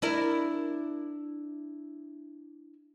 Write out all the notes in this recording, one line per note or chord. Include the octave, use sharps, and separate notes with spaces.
D4 E4 A#4